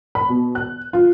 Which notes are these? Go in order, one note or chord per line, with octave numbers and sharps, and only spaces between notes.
B5
B2
F#6
F4